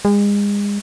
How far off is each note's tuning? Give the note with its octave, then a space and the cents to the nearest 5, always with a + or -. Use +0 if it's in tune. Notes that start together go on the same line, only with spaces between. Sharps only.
G#3 -35